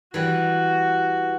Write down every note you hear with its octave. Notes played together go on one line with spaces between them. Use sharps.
E3 G3 F#4